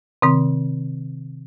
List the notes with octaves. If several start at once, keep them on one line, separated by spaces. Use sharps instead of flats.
C3 D#3 C4